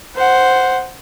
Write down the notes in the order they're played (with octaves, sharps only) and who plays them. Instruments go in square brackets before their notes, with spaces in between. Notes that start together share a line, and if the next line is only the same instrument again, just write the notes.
[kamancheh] C5 F#5